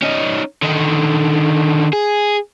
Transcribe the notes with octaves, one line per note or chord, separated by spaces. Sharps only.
C#4 D#4
D3 D#3
G#4